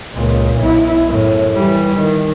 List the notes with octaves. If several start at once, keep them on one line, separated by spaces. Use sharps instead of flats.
C#2 A#2
B1 E4
F#2 A2
E3 G3
D#3